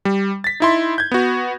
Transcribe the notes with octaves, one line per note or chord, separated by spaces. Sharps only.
G3
A6 B6
D#4 E4 C6
G6 G#6
B3 F#4